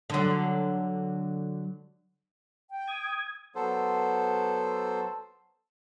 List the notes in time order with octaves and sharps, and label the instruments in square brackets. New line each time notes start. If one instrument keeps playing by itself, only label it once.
[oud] D3 F#3
[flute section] G5
[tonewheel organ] D#6 G#6
[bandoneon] F#3 B3 A4 C5